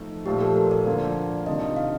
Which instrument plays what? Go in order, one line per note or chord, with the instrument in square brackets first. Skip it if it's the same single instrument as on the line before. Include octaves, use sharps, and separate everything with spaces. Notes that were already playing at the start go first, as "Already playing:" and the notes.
Already playing: [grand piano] F3 A3 D#4
[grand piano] A#2 F3 A3 [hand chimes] G4
[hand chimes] A4
A#4
D5
[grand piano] D3 F3 A#3 F4
[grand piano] C3 D#3 A#3 D4 F4 [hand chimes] D#5
[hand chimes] D#5
F5